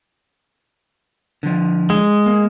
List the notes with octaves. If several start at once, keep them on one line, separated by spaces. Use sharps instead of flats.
D3 F3
G#3
A#3